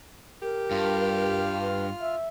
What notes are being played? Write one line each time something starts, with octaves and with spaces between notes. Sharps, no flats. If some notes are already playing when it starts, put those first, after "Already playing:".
G4 A#4
G2 F4 F6
B4
E5